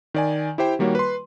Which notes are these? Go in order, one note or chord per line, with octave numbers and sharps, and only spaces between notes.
D#3 D5 G#5
E4 G4 C5 G5
D#3 G3 A#3 F#4 C#5
B4 C6